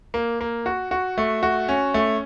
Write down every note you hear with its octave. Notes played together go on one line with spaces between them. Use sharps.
A#3
A#3
F#4
F#4
A3
F#4
C#4
A3